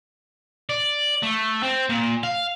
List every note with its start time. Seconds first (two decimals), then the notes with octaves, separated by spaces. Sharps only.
0.69 D5
1.23 A3
1.63 C4
1.89 A#2
2.23 F5